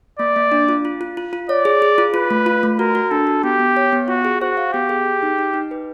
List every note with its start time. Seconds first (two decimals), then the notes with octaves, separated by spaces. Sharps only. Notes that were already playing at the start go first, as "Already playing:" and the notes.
0.19 A#3 D5
0.36 A#3
0.52 D4
0.69 F4
0.85 F4
1.01 F4
1.17 F4
1.33 F4
1.49 C#5 D5
1.65 G#4
1.82 G#4
1.98 F4
2.14 F4 B4
2.31 A3
2.46 F4
2.63 A3
2.79 F#4 A#4
2.95 F#4
3.11 D4 A4
3.27 F#4
3.43 B3 G4
3.59 B3
3.77 C#5
3.93 B3
4.08 F4 F#4
4.25 G#4
4.41 F#4 C5
4.57 F5
4.73 B3 G4
4.89 G#4
5.06 G#4
5.23 D#4
5.39 D#4
5.54 D#4
5.71 B4